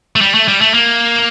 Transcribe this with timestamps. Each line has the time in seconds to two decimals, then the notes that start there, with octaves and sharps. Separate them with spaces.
0.16 A3
0.21 G3
0.34 A3
0.48 G3
0.61 A3
0.74 A#3